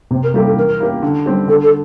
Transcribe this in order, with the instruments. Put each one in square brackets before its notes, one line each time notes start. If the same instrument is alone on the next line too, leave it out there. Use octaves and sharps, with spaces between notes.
[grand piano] C3 [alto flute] C4
[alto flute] A#4
[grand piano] G3 A#3 E4 G4 [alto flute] A4
[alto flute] A4
[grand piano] E3 [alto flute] A#4
[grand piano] A#3 E4 G4
D3
G3 C4 G4
[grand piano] D3 [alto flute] A4
[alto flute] A4